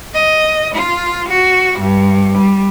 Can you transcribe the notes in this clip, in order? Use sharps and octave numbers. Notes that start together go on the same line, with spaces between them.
D#5
F4
F#4
G2
G3